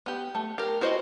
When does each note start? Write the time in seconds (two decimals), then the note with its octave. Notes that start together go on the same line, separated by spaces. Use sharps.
0.06 B3 G4
0.35 A3
0.58 G4 A#4
0.81 E4 F#4 C5 D5 D#5